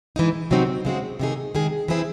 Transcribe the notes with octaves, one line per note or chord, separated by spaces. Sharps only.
E3 G#3 D#4
C3 F#3 C4 D#4 F#4
C#3 G#3 C4 F#4
C3 D#3 A3 D#4 G#4
D#3 G#3 D#4 G#4
E3 C4 E4 G#4